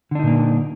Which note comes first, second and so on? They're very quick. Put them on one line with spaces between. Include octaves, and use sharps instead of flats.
D3 D4 D#4 A#2 A#3